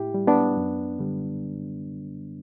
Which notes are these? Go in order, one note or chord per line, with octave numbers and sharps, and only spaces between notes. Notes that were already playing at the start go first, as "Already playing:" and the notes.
Already playing: A2 E4 G4
G3
B3 D4
F#2
D3 G3